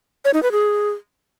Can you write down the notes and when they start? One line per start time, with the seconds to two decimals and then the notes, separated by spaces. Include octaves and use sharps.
0.25 C#5
0.34 D#4
0.43 B4
0.52 G#4